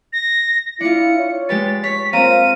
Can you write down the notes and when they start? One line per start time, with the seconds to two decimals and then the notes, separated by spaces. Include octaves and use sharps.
0.13 A#6
0.81 D4 E4 F4 C#7
1.17 C#5
1.49 G#3 G4 B4 A6
1.84 C#5 B6
2.13 A#3 C4 F4 C5 F5 A#5 D#7